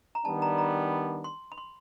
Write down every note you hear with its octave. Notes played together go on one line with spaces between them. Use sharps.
A#5
D#3 G3 B3 D4 A5
A#5
A#5
C6
B5
C6